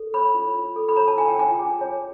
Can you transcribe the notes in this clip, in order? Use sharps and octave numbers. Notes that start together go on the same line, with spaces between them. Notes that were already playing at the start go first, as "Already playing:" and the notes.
Already playing: A4
C#5 B5
F4
F4
A4
B5
C#5 A#5
A5
F4 G#5
G5
F4 G#5
G#4
C#5